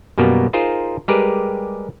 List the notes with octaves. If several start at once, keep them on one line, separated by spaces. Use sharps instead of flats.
F#2 B2 G3 A#3 B3
D#4 F4 G#4 A#4 C5
G3 G#3 G4 G#4 A#4 B4